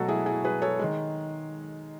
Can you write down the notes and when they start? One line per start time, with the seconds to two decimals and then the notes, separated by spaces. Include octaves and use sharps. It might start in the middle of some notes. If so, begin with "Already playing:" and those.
Already playing: B2 F#3 A3 F#4 A4
0.08 E4 G#4
0.26 E4 G#4
0.45 G#4 B4
0.62 A4 C#5
0.79 D#3 G#3